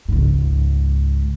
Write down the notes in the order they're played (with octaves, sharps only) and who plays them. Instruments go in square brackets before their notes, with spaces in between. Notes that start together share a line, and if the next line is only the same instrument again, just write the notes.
[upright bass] C#2 G#2